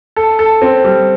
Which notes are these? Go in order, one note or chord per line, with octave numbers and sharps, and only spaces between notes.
A4
A4
C4
G3